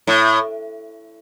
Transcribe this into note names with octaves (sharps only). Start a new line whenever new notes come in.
A2